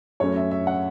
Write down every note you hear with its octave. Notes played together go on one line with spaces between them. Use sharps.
F#2 F#3 A3 C#4 C#5
E5
E5
F#5